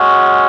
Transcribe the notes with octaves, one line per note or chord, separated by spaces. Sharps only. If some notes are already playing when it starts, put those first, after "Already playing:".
Already playing: G#3 C#4 F#4